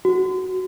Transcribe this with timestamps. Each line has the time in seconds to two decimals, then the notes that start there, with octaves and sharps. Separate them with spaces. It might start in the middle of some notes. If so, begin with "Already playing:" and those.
0.05 F#4